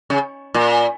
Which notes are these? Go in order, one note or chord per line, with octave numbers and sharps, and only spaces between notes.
C#3
A#2